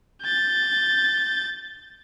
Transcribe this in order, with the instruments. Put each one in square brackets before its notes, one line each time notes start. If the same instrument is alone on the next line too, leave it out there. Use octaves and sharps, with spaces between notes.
[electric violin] G6 A6